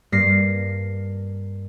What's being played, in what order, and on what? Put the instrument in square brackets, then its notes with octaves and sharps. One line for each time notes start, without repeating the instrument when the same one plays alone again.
[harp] G2 A#3 A#6 C7